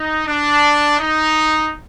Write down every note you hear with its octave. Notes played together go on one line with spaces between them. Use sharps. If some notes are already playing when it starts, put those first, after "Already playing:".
Already playing: D#4
D4
D#4